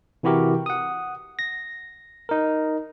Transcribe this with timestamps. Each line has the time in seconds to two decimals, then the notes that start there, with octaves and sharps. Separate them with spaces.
0.23 C3 E3 E4 F#4 G4 A#4
0.66 F#5 D#6
1.39 A#6
2.29 D#4 A#4